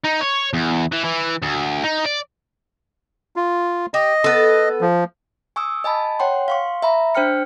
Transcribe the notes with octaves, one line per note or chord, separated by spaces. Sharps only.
D#4
C#5
E2
E3
E3
D2
D#4
D5
F4
G4 D#5
B3 A4
F3
G#5 C#6 D#6 E6
D#5 G#5 A5 B5
C#5 F#5 G5 C6
F5 C6 C#6
E5 A#5 B5
D4 C5 G5 F6 C#7